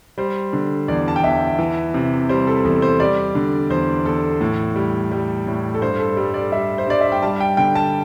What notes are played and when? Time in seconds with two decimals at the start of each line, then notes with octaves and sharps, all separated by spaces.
0.18 G3 C5
0.53 D3
0.88 E2 D5
1.08 A5
1.16 G5
1.23 E2 E5
1.59 E3
1.94 C3
2.29 G3 C5
2.47 A4
2.65 E2 A4
2.82 C5
3.00 G3 D5
3.35 D3
3.70 E2 C5
4.05 E2 A4
4.41 A2
4.76 G3
5.12 G3
5.47 A2
5.74 A4
5.81 G2 C5
6.00 A4
6.17 G3 A4
6.34 D5
6.52 G3 E5
6.78 C5
6.87 G2 D5
7.01 E5
7.12 G5
7.22 G3 A5
7.40 G5
7.57 D3 G5
7.75 A5